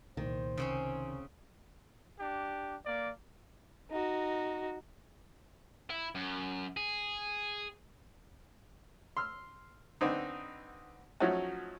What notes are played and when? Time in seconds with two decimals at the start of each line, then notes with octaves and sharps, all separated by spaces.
0.17 C2 A#2 D#3 C5
0.57 C2 C#3 C4 C#4
2.20 D4 G4
2.86 A#3 D5
3.90 D#4 F#4
5.90 E4
6.15 F#2
6.77 G#4
9.17 C6 E6 F6
10.01 D3 B3 C4 D#4
11.20 F3 F#3 A3 C#4 D#4 F#4